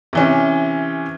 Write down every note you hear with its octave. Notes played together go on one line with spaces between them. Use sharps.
C3 E3 C#4